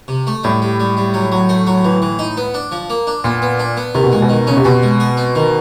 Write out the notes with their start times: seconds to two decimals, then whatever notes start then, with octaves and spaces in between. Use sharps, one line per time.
0.08 C3
0.27 A3
0.44 A2 G3
0.62 G3
0.80 G3
0.97 G3
1.14 F#3
1.32 F#3
1.49 A3
1.67 F#3
1.84 E3
2.02 E3
2.19 D#4
2.37 B3
2.54 D4
2.72 F3
2.90 A#3
3.07 D4
3.24 A#2 B3
3.42 B3
3.59 D4
3.77 B3
3.95 C3 D#3
4.04 B2
4.12 A#2 G#3
4.22 B2
4.29 D#3
4.47 C#3 C#4
4.57 C3
4.65 B2 C4
4.83 G#3
5.00 G#4
5.17 C4
5.35 D#3